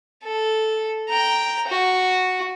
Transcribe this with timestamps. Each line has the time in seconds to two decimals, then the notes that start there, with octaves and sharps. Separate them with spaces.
0.24 A4
1.09 G5 A#5
1.68 F#4